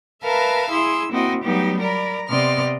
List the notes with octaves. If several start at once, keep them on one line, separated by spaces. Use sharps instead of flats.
A#4 B4 E5 F5 A5 A#5
E4 G#4 C6 E6
A#3 C4 E4 F#4 D#5
F#3 G3 A3 B3 D#4 G4
A#4 D5 A#5 B5
C3 B3 D5 D#5 C6 F6